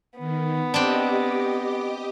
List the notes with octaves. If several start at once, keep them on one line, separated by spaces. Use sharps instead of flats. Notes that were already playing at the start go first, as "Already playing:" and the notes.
D#3 B3
C4 D4 G4 D#5 D6